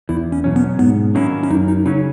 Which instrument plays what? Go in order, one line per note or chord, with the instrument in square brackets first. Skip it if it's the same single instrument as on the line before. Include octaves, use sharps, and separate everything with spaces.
[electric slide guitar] E2 [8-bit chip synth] E4
[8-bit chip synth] C#4
[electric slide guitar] B2 F#3 C#4
[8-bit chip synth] B3
[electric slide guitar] G#2 [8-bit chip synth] B3
[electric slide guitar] D#3 F#3 A#3 E4 [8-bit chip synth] C#4
[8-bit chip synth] C#4
[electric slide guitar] F#2 [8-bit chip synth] D#4
[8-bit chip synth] D#4
[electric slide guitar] C#3 F#3 C#4 [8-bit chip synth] D#4